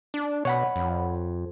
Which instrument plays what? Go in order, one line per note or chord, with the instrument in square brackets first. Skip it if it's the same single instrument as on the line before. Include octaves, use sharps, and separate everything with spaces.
[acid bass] D4
[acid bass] B2 [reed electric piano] C#5 F#5 B5
[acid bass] F2